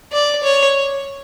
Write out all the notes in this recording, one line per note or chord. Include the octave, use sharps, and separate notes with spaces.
D5
C#5